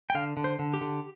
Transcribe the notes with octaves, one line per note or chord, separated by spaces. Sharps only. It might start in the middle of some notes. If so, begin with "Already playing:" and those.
G5
D3 F5
D3
C5
D3
G4
D3